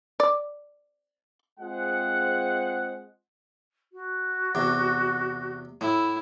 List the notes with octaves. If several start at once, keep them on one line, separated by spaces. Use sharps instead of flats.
D5
G#3 C4 F4 G#4 C5 F#5
F#4
E2 C3
A2 E4